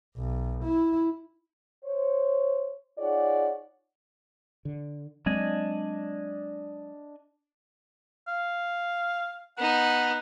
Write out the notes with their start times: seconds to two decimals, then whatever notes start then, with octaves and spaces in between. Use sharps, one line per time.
0.17 B1
0.63 E4
1.84 C5 C#5
2.99 D#4 F4 G#4 C#5 D5 F#5
4.65 D3
5.26 F#3 G#3 C4 D4 D#5 G#5
8.27 F5
9.57 B3 D#4 F#5